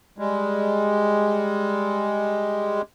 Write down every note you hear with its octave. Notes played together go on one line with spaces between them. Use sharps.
G3 G#3